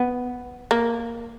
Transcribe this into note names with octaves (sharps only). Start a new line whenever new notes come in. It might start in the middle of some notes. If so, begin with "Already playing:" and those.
Already playing: B3
A#3